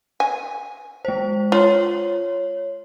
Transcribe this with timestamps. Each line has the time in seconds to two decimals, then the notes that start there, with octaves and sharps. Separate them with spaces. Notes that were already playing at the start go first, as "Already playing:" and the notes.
0.20 G#5
1.05 G#3 C5
1.52 F4 C#5